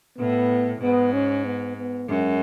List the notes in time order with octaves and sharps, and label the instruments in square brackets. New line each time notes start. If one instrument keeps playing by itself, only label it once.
[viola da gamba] A2 [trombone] B3
[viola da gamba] G#2 [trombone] B3
[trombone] C#4
B3
B3
[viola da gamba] F#2 [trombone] G#3